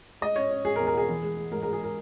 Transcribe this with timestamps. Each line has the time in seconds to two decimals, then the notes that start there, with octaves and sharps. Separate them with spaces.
0.21 G#3 D#5
0.36 C#4 C#5
0.51 C#4
0.65 G#3 G#4
0.76 A#4
0.80 E2
0.87 A#4
0.93 B2 G#4
1.09 E3
1.23 G#3
1.37 G#3
1.52 G#2 A#4
1.62 G#3 A#4
1.73 G#4
1.81 G#3 A#4